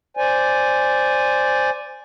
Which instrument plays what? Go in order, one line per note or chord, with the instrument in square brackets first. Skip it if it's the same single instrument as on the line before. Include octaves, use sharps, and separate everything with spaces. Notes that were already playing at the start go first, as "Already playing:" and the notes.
[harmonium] C5 D5 G#5